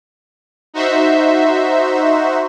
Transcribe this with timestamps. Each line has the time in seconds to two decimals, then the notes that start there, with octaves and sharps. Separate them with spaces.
0.74 D#4 F#4 C5 E5